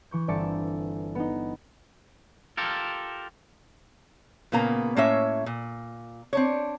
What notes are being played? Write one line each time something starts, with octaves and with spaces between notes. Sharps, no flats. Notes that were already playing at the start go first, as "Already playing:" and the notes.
E3 C#6 G6
G1 C4 D5 E5 A5 C#7
B3 D#4
F4 G4 A4 A#4
A#2 C#3 A#3 B3 A#5
A2 A#3 C#4 C#5 E5
A#2
C4 D4 C#5